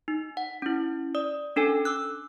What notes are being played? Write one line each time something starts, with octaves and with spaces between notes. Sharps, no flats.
D#4
F#5
C#4 E4
D5 D#6
C#4 D4 A4 G#5
D6 E6 F#6